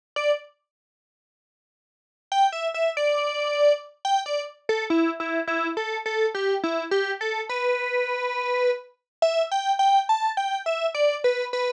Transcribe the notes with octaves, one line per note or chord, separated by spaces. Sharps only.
D5
G5
E5
E5
D5
G5
D5
A4
E4
E4
E4
A4
A4
G4
E4
G4
A4
B4
E5
G5
G5
A5
G5
E5
D5
B4
B4